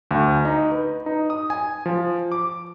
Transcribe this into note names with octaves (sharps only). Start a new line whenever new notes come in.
D2
D#4
B4
D#4
D#6
G#5
F3
D6